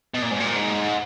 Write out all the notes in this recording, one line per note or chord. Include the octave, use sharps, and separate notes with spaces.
B2
A#2
G#2
A#2
G#2